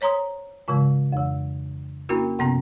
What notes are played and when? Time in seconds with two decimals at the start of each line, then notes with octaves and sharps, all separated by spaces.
0.01 C5 C#5 A#5 C6 D#6
0.68 G#2 C#3 E3 G#3
1.12 F2 E3
2.09 A#3 C#4 D4 E4 F#4 A#4
2.39 F#2 C3 F3 B3 C#4 A5